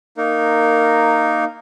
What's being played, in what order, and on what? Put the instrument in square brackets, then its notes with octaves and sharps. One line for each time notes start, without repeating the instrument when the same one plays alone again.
[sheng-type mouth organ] A#3 D#4 A#4